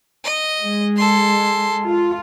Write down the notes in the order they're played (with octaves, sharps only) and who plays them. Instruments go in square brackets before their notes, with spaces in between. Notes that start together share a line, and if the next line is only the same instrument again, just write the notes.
[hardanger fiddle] D#5
[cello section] G#3
[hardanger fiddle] A4 C6
[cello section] F4